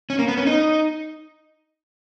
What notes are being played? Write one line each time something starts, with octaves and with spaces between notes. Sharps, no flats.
C#4
A#3
B3
C#4
D#4